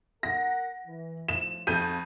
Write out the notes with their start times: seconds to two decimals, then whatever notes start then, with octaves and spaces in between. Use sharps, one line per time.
0.23 A#4 F#5 A#6
0.86 E3
1.28 A2 F3 E7
1.67 F2 G6 D#7